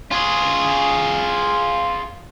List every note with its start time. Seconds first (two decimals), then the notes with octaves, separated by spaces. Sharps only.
0.12 F4 G#4